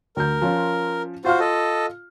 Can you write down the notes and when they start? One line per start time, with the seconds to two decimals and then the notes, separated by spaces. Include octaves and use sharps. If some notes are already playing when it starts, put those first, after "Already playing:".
0.16 D2 A#4 G6
0.42 F3 C#4 F4
1.25 F4 F#4 C5 F5 F6
1.40 A4 D#5